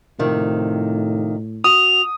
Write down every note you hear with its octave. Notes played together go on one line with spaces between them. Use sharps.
F2 A2 C3 D#3
F#4 D#6 F7